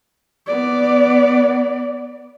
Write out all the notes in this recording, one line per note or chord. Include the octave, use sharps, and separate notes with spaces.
B3 D5